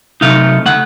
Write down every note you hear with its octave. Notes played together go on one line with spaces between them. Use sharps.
C3 F#3 A3 D#4 F5
C#3 A3 F#5